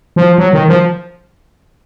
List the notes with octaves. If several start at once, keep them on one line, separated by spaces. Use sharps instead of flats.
F3
F#3
D#3
F3